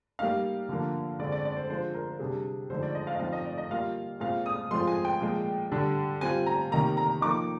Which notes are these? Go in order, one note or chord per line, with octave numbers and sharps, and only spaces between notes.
G3 A#3 D#4 F5
D3 F3 A#3 D4
D3 G#3 C4 D5
D5
D5
C5
F3 G#3 D4 F4 C5
A#4
C3 G3 D4 G#4
D3 F3 G#3 D#4 C5
D5
D#5
F5
D#5
F3 C4 D#4 F5
D#5
D5
D#5
G3 A#3 F4 F5
A#2 G#3 C4 F4 F5
D#6
F3 G#3 C4 F4 C6
G#5
G5
A#2 F3 G#3
D3 G3 D4
G3 C4 F4 G#5
A#5
C3 D#3 A#3 A#5
A#5
F3 A#3 D#4 D6